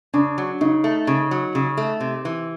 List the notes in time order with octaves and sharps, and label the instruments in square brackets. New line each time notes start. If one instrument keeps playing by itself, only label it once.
[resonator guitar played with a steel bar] C#3 [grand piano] D4
[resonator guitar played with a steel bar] F#3
[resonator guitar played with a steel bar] C#3 [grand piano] D#4
[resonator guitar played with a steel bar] A3
C#3
F#3
C#3
A3
C3
E3